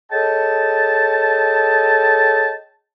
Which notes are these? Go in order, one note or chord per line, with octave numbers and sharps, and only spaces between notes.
G#4 A4 C#5 D#5 G5 A5